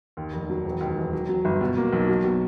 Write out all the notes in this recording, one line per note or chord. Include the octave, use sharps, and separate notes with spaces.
D#2
F1
F#3
E1
D#2
E1
F#3
F#3
G1
B2
A#3
B1
F#3
B2